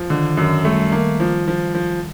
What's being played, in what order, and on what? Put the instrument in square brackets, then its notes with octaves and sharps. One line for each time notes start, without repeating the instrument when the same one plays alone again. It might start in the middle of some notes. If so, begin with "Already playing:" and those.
Already playing: [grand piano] F3
[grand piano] D3 [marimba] D#3
[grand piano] F#2 [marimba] D#3
[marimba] G3 [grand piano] A3
[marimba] D#3 [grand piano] A#3
[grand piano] F3
F3
F3